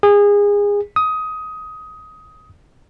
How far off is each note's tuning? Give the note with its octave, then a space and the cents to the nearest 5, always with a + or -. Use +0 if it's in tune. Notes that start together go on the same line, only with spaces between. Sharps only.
G#4 -25
D#6 +15